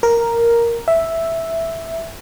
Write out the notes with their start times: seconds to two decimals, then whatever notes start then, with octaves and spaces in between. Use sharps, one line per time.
0.03 A#4
0.88 E5